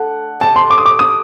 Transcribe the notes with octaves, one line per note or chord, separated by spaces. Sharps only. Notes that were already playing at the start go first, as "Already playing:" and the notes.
Already playing: A2 A3 D4 A4 F#5
D3 A3 D#4 G4 A5
C6
D6
D#6
D6
D#6